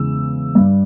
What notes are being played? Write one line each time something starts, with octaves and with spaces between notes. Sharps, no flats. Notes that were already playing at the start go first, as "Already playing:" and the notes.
Already playing: E2 C#3 E3 G#3 E6
G2 G3